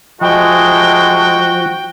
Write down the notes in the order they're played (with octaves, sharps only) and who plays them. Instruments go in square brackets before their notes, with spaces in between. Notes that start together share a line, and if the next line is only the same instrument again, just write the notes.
[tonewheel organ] F3 [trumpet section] G#3 A3 D#5 [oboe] F#4 [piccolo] G5